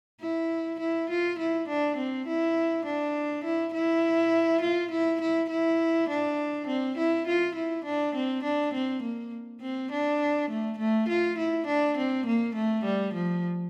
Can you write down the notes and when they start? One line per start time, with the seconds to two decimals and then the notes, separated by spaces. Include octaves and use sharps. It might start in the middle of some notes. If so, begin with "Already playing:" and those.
0.21 E4
0.80 E4
1.10 F4
1.39 E4
1.68 D4
1.97 C4
2.27 E4
2.85 D4
3.44 E4
3.74 E4
4.62 F4
4.91 E4
5.21 E4
5.50 E4
6.09 D4
6.67 C4
6.97 E4
7.27 F4
7.55 E4
7.85 D4
8.15 C4
8.43 D4
8.74 C4
9.02 A#3
9.61 C4
9.92 D4
10.50 A3
10.79 A3
11.09 F4
11.38 E4
11.67 D4
11.97 C4
12.26 A#3
12.55 A3
12.85 G3
13.14 F3